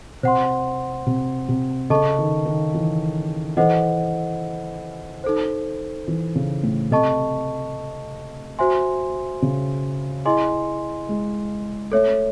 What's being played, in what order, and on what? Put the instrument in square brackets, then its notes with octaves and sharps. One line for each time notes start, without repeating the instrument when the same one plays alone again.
[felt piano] C3 [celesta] C5 F#5 C6
[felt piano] C3
C3
[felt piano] C#3 [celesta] A4 D#5 A5 C#6
[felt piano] D#3
D#3
E3
[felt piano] E3 [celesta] A4 C5 D#5 F#5
[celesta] D#4 A4 C5
[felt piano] E3
C#3
A2
[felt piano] C3 [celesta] A4 D#5 A5 C#6
[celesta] F#4 C5 E5 G#5 C6
[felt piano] C#3
[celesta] E4 G#4 D#5 G#5 C6
[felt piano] G#3
[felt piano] A3 [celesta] A4 C#5 E5